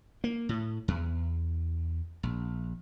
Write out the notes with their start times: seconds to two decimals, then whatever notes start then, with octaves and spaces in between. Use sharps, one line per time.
0.24 A#3
0.49 A2
0.88 E2
2.23 A#1